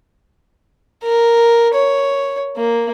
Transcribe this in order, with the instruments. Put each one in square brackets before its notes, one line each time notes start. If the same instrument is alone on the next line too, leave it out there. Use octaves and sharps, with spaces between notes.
[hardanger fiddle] A#4
C#5
A#3